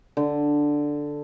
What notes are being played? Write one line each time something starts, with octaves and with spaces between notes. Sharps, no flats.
D3